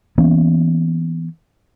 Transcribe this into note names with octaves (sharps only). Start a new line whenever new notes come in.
E3 A#3 B3 C#4